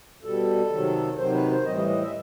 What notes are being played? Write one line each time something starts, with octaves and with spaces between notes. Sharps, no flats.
B2 G3 A4
C3 D#3 F#3
C3 D#3 F#3 C5
B4
C5
A2 E3 G3 D#5
D#5
D#5
E5